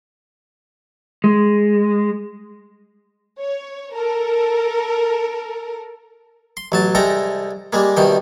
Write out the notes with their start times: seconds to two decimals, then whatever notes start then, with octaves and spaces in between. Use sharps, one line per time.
1.24 G#3
3.40 C#5
3.94 A4 A#4
6.57 C6
6.72 A1 F#3 A5
6.95 C2 G#3 A4 G5 A#5
7.73 G3 G#3 A#3
7.97 C2 B2 D#3 G5